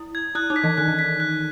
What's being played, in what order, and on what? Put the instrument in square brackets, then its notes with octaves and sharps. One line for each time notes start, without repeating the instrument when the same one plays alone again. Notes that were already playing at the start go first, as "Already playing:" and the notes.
Already playing: [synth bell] E4
[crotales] G#6
[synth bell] E4 [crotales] F#6
[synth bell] D#4
[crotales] B6
[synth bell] E3
[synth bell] D#3 [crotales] F#6
[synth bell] E3
[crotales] B6
F#6